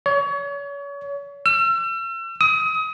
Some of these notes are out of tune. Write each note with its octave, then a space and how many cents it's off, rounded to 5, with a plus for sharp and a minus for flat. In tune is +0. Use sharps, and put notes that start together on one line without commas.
C#5 +35
E6 +40
D#6 +30